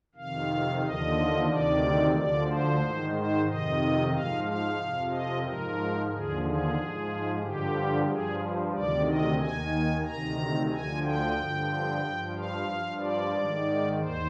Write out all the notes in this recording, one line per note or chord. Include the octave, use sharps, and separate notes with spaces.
F2 C3 D#3 F5
D#2 D3 F3 D#5
D2 C3 D#3 D5
D2 D3 F3 D5
C5
G#2 D#3
C5
F2 C3 D#3 D#5
G#2 F3 F5
F5
F2 C3 F3
D#5
G#2 F3 A#4
D#2 D3 F3 G#4
G#4
G#2 F3
G2 D3 F3 G4
G2 F3 G#4
D2 C3 D#3 D5
D#5
D#2 D#3 G#5
D2 C3 D#3 A#5
D2 D3 F3 G#5
G5
G2 D3 F3
G2 F3
F5
G2 F3
D5
G#2 D#3
D#2 C5